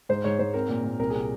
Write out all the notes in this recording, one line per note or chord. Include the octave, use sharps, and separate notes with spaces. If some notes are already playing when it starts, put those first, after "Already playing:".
G#2 C5
G#2 C#5
G#2 C5
C4 A#4
A#2
A#2
C2 A#4
G#4
C3